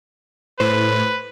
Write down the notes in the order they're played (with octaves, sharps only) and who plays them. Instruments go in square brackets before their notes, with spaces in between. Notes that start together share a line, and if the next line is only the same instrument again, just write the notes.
[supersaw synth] A2 [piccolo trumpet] B4 [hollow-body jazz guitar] C5